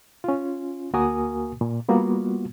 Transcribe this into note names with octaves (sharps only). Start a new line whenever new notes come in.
C#4 F4
D2 A#3 F#4 A#4 G#5 D#6
A#2
G3 A#3 B3 F4 F#4